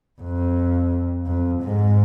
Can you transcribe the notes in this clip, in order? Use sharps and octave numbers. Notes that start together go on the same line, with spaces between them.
F2
F2
G#2